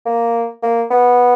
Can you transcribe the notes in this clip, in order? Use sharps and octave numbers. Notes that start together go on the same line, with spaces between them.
A#3
A#3
B3